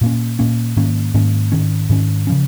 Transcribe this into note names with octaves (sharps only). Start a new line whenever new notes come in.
A#2 A#3 C#4
A#2 A#3 C#4
G#2 D#3 A#3 C#4
G#2 D#3 A#3 C#4
G#2 D#3 C#4
G#2 D#3 C#4
C#3 F3 C#4